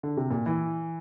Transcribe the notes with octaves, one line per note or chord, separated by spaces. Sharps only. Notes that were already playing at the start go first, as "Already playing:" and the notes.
D3
C3
A#2
E3